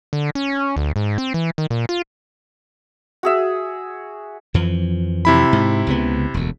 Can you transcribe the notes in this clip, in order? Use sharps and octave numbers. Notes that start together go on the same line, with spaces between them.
D3
C#4
D2
G#2
C4
E3
D#3
A#2
F4
F#4 G#4 E5
F2 E3 F3
C3 E4 B5
G#2
C#2 C#3 B3
E1 D2